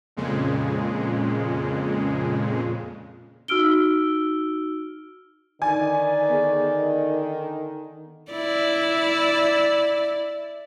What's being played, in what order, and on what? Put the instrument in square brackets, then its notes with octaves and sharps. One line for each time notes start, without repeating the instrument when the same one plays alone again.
[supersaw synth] F2 A#2 C#3 G#3
[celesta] D#4 F#4 E6 F6 D7 G7
[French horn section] D3 D#3 [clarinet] D5 [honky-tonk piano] G#5
[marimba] B3 G#4
[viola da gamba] E4 D5